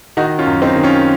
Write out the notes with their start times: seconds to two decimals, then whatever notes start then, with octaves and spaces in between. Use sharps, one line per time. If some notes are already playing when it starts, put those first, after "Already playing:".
0.17 D#3 D#4 F#4
0.39 C#4 F4
0.47 F#2
0.62 C4 D#4
0.76 D#3
0.83 C#4 F4